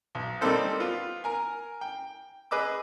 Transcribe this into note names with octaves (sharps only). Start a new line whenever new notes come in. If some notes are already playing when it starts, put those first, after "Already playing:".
B1
G3 A#3 C4 D#4 A4 C5
B3 F4
A#4 G#5
G5
G#4 B4 D#5 D6 E6